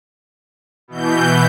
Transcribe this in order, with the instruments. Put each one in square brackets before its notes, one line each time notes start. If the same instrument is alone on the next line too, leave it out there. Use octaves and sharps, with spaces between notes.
[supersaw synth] B2 E3 G6